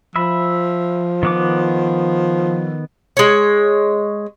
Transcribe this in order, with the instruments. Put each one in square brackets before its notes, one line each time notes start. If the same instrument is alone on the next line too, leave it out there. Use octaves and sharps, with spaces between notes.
[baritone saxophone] F3 [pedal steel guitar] E5 B5
[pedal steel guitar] D#3 B3 D6
[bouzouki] G#3 C#5